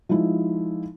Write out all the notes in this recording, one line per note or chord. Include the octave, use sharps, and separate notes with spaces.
F3 G#3 D#4 E4